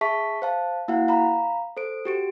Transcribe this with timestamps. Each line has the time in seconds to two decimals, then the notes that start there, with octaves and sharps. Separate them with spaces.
0.01 G#4 E5 A5 C#6 B6
0.42 C5 F5 A5
0.88 A#3 E4 F#4 F5 F#5
1.08 F5 A#5 B5
1.77 A4 C5 D7
2.05 F#4 G4 D7